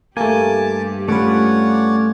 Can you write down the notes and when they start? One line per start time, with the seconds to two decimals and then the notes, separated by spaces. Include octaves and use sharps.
0.17 G2 A3 A#3 G4 G#5 A5 D6
1.08 A3 C#4 F4 B4 C#5 D5 F#5 D6